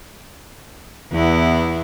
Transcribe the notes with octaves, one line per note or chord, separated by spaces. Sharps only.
E2 B3 E4